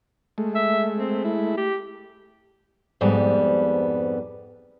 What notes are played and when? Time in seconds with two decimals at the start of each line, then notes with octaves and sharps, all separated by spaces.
0.38 G#3 A3
0.55 E5
0.98 C4
1.24 E4
1.57 G4
3.01 F2 G#2 G3 B3